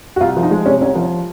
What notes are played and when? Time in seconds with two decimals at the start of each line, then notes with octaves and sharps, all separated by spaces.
0.16 F#4
0.21 C2 F4
0.37 F3
0.43 D#4
0.51 G#3
0.65 C3 C#4
0.81 C2 C#4
0.95 F3